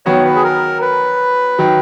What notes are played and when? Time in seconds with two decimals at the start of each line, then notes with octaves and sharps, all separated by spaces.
0.06 D#3 F#3 B3 F#4 C#5
0.24 B4
0.36 G#4
0.44 A#4
0.82 B4
1.58 D#3 F#3